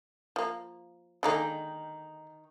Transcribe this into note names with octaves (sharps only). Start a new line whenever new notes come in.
F3 A#3
D3 D#3 G#3 A#3 D#4 G5